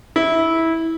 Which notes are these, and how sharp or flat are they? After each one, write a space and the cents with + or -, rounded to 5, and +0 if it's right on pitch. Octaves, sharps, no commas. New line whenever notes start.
E4 -15